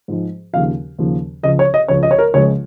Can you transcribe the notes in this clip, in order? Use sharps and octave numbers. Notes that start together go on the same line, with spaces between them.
G#2 F3 G#3
D#2 C#3 F3 F5
D#2 C#3 F3
C#2 C#3 F3 D#5
C#5
D#5
C#2 C#3 F3 C#5
D#5
C#5
A#4
C#2 C#3 F3 G#3 C#5